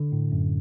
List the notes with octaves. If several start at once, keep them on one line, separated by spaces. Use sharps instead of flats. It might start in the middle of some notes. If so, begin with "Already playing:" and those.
Already playing: D3
A2
F#2